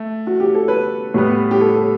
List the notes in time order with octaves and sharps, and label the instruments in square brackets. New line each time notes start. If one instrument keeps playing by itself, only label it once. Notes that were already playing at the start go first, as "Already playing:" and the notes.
Already playing: [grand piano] A3
[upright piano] F#4
G4
A4
B4
[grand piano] A2 G3 B3
[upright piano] G4
A4
A4